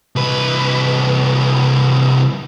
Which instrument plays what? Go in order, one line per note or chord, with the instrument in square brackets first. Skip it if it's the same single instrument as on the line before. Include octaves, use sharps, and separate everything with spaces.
[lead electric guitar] C2 B4